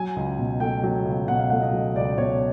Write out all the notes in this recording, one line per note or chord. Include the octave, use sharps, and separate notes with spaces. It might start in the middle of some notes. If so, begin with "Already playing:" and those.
Already playing: F#3 G#5
C#2
B2
A3 G5
F#3
C#2
B2 F#5
F5
A3 F#5
D#5
F#3
C#2 D5
B2 C#5